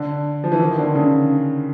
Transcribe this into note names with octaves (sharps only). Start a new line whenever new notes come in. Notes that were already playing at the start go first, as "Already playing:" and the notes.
Already playing: D3
F3
E3
D#3
D3
C#3